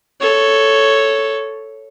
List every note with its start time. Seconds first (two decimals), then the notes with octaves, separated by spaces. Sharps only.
0.21 A4 C#5